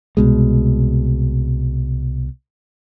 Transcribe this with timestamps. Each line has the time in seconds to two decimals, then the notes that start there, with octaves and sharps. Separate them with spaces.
0.17 C2 B2 G#3